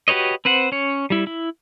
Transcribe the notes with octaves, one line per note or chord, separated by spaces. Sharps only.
F#4 G4 B4 C#5 D#5
C4 B4 C5 F#5
C#4 C#5
G3 E4
E4